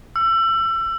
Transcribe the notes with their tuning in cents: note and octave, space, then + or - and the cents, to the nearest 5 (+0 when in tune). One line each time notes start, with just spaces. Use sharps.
E6 +30